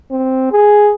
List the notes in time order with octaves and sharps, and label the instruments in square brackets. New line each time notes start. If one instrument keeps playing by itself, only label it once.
[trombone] C4
G#4